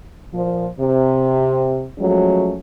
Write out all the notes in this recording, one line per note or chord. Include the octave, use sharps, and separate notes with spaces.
A#2 F3
C3
F3 F#3 G#3 A3 C#4